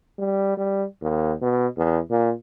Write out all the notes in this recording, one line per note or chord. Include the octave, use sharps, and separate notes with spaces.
G3
G3
D#2
B2
E2
A#2